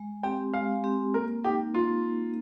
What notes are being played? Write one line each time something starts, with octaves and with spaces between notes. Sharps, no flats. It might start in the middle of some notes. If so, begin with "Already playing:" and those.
Already playing: G#3
C4 G4 G5
G#3 F5
C4 G4
A#3 A#4
D#4 G4 A#4
A#3 F4